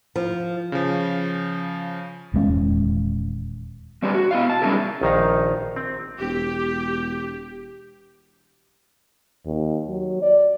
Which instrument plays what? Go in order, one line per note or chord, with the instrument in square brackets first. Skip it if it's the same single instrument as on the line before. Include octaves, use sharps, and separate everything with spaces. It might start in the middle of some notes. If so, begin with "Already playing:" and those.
[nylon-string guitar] F3
[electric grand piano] C#3 F3
[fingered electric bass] D#1 E2 G#3 C#4
[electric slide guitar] G3 C4 D4 G4 G#4 B4
F#4
B3 E4 F5
A5
G3 C#4 D#4 E4 G#4 A#4
[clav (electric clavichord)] A#1 D#3 D#4 F5
C4
[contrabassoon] E1 [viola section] G4
[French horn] D#2
F#3
D5